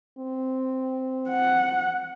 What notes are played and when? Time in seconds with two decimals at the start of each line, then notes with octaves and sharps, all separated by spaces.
0.18 C4
1.30 F#5